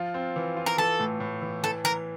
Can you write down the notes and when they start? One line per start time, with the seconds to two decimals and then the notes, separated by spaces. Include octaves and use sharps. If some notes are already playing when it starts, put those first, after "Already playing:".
Already playing: F3 F4
0.14 C4
0.36 E3
0.57 F4
0.66 A#4
0.78 E3 A4
1.00 A2
1.20 A2
1.42 E3
1.63 E3 A4
1.84 E3 A#4